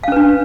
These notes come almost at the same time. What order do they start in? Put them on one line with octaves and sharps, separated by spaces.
F5 C#4 B4 D4